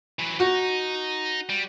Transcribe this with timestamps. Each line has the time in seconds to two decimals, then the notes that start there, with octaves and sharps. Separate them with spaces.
0.19 E3 F#3
0.40 D#4 F#4
1.49 G3